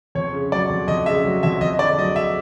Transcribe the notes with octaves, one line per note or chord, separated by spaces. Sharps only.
F2 C#5
C#3
F#3 D5
F2
F2 D#5
C#3 E5
F#3
F2 E5
F2 D#5
D3 D5
F#3 D#5
E5